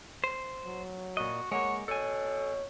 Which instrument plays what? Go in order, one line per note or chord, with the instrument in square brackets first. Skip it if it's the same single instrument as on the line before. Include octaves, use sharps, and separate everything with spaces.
[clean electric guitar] C5
[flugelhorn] F#3
[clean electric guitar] A#2 D#5 [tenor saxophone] F#4
[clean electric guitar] G#3 A#3 [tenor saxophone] C#5 [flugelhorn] F#5
[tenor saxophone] B2 [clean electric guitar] A4 G#5 [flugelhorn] C#5